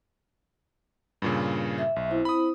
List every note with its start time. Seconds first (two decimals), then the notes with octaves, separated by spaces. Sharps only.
1.22 G2 A#2 C#3
1.78 E5
1.96 B1
2.10 C4 E4 C5
2.25 B5 D#6